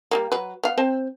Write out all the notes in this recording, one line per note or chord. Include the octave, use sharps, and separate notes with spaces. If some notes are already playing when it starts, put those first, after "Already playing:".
G3 G#3 A#3
F#3 B4
B3 F5
C4 C5 A5